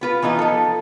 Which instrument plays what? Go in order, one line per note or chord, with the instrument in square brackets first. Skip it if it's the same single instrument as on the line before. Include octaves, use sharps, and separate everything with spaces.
[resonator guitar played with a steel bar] B3 F4 B4
E3 B3 D#4 F4
F3 A4